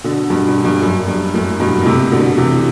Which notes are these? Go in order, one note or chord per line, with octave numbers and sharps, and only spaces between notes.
B2 D3
G2 B2
G2 B2
G2
F#2
G2
F#2 A2
G2 B2
B2
A2 C3
B2 D3
C3 E3